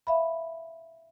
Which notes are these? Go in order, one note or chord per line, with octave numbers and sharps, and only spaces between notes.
E5 F5 B5